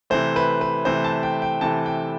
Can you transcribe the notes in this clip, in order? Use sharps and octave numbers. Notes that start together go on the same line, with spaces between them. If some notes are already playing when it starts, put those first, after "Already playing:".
C3 E3 A3 C5
B4
B4
C3 E3 A3 C5
A5
G5
G5
C3 E3 A3 A5
G5